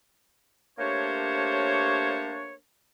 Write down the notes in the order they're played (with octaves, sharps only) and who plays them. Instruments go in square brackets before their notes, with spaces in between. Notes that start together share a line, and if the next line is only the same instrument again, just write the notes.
[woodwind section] A3 A#3 D4 G4 C5 C#5